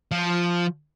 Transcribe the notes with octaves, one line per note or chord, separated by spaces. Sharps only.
F3